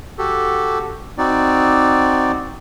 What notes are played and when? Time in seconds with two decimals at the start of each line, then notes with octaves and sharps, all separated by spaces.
0.18 F#4 G4 A4
1.18 C4 D#4 F#4 D5